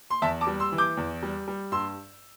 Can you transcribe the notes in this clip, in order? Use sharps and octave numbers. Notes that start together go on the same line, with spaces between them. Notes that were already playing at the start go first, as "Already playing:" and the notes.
C6
E2 E5 A5
A5 D6
G3
C6 E6
E3
D6 G6
E2
G3
G3
G2 C6 E6